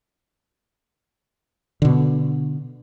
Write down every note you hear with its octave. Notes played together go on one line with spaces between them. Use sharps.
B2 D3